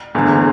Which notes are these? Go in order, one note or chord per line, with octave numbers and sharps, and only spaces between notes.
F#1 E2 D3